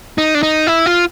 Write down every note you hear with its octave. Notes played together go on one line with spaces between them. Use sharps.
D#4
D4
D#4
E4
F4